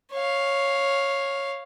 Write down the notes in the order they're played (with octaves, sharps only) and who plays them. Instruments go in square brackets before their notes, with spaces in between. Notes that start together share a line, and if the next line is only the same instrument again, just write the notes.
[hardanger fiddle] C#5 F5